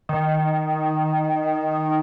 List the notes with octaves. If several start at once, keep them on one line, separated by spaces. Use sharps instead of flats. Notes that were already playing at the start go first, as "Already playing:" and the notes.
D#3